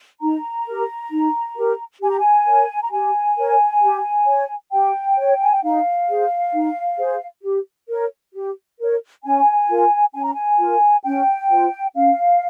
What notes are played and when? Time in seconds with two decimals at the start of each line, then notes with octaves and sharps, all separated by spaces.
0.21 D#4 A#5
0.66 G4 A#4
1.11 D#4
1.57 G4 A#4
2.01 G4 G#5
2.09 A#5
2.18 G#5
2.47 A#4 C#5
2.83 A#5
2.92 G4 G#5
3.37 A#4 C#5
3.82 G4
4.27 C#5
4.72 G4 G5
5.17 C#5
5.42 G#5
5.52 G5
5.63 D#4 F5
6.08 G#4 C5
6.53 D#4
6.98 G#4 C5
7.43 G4
7.88 A#4 C#5
8.34 G4
8.79 A#4 C#5
9.24 C#4 G#5
9.69 F4 A#4
10.14 C#4 G#5
10.24 A#5
10.34 G#5
10.59 F4 A#4
11.04 C#4 G5
11.49 F4 C5
11.94 C#4 F5